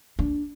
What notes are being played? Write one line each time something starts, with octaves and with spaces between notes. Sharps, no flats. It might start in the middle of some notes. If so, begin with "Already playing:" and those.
D4